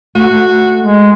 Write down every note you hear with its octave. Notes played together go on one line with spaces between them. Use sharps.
A3 F#4
G#3